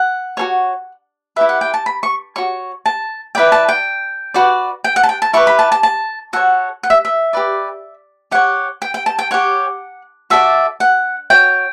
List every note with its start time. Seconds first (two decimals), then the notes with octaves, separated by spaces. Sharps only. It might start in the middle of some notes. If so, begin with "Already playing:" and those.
Already playing: F#5
0.37 F#4 A4 C#5
1.36 E4 G4 B4 E5
1.49 F#5
1.61 G5
1.74 A5
1.86 B5
2.03 C#6
2.36 F#4 C#5 C#6
2.86 A5
3.35 E4 B4 D5 G5
3.52 A5
3.69 G5
4.34 F#4 B4 D5
4.84 G5
4.96 F#5
5.03 A5
5.09 G5
5.22 A5
5.33 E4 G4 B4 C#6
5.47 B5
5.59 A5
5.72 A5
5.83 A5
6.33 F#4 A4 C#5 F#5
6.83 F#5
6.90 E5
7.05 E5
7.33 G4 B4 D5
8.31 G4 C#5 F#5
8.82 G5
8.94 G5
9.06 A5
9.19 G5
9.31 G4 C#5 F#5
10.30 F#4 A4 D5 E5
10.80 F#5
11.30 F#4 C#5 G5